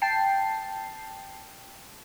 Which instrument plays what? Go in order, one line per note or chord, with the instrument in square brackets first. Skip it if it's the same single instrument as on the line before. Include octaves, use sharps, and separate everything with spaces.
[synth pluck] G5 A5 C7